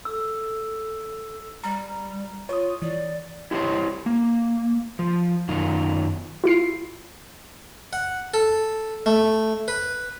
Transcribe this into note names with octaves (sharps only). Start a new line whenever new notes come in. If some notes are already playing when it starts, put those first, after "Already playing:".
A4 E6
G3 A#5
F4 C#5 D#6
E3 D5
E4 G4 A#4 C5 C#5
A#3
F3
F#2 D#3 F4
E4 F4 C7
F#5
A4
A3
B4